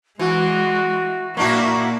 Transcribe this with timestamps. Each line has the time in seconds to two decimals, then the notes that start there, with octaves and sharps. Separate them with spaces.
0.19 E3 G#3 F#4
1.37 A#2 A#3 D4 E4 F#4 C#6